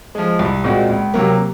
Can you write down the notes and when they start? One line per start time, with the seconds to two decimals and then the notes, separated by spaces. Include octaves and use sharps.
0.15 F3 G#3
0.39 C2
0.64 A#2 G#3 C4 F#4
0.89 C#2
1.14 C3 F#3 A#3